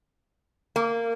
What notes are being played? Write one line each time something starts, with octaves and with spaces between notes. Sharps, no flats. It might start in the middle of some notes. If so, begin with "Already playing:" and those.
A#3